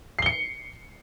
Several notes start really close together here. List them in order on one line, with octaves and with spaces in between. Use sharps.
C7 G7 C#7